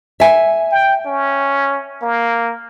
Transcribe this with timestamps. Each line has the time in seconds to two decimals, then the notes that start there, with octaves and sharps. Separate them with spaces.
0.20 E5 G#5
0.71 G5
1.06 C#4
2.02 A#3